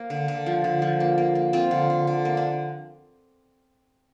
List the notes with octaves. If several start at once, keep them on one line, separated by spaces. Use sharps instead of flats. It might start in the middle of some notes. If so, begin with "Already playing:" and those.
Already playing: A#3 C5
D3
D3
F3
D3
F3
A#3
A#3
A#3
A#3 C4 F4
D3
D3
D3
A#3
D4